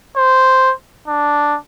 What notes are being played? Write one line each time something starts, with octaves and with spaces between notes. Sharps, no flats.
C5
D4